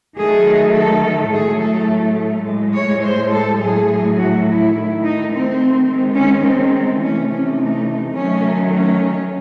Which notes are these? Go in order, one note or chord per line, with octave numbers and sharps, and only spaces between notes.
D#3 F#3 A3 G#4
A4
A2 F#3 A3 G#4
A4
A2 G#3
C#5
C5
A4
A2 F#3 A3 G#4
F#4
E4
D#3 A3
D#4
C4
D#3 G#3
C#4
C4
C3 E3 A3 C#4
C#4
D#4
D#3 F#3 A3 C#4
C#4